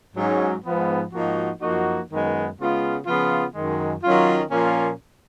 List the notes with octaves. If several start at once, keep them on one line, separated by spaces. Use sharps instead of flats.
G#2 F#3 C#4
G#2 F3 B3
G#2 F3 A#3 D#4 F#4
F#2 F3 A#3 D#4 F#4
F#2 D#3 G#3 B3
C#3 G#3 B3 F4
C#3 F3 B3 F4
F#2 D#3 G#3
D#3 F#3 C#4 F4
A#2 F3 A#3 C#4 F4